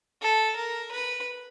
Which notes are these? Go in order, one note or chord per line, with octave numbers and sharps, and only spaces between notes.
A4
A#4
B4